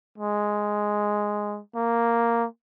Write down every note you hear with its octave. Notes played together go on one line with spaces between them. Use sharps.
G#3
A#3